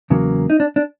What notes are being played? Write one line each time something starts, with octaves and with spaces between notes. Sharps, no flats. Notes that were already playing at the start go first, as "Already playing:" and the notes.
E2 C#3 F#3 A#3
D#4
D4
D4